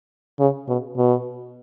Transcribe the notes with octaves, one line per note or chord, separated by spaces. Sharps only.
C#3
B2
B2